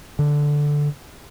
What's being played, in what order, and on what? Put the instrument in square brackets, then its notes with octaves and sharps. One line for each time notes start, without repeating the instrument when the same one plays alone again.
[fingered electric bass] D3